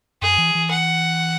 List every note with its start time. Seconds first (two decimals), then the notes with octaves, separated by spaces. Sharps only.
0.22 F#2 G#4
0.38 E3
0.55 E3
0.71 F#5